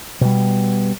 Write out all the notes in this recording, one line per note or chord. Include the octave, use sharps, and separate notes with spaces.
B2 G3